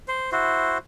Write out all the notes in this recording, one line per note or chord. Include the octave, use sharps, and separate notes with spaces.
C5
E4 F#4 C5